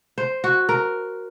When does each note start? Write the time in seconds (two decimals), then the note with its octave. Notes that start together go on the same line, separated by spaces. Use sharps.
0.18 C5
0.44 F#4
0.69 A#4